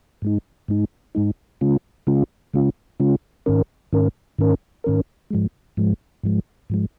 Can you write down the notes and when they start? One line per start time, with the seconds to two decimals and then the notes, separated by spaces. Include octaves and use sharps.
0.22 G#2 G#3 D#4
0.68 G#2 G#3 D#4
1.15 G#2 G#3 D#4
1.61 C#3 G#3 C#4 F4
2.07 C#3 G#3 C#4 F4
2.54 C#3 G#3 C#4 F4
3.00 C#3 G#3 C#4 F4
3.46 G#2 D#3 C#4 A#4
3.93 G#2 D#3 C#4 A#4
4.38 G#2 D#3 C#4 A#4
4.84 G#2 D#3 C#4 A#4
5.31 G#2 F3 G#3
5.77 G#2 F3 G#3
6.23 G#2 F3 G#3
6.70 G#2 F3 G#3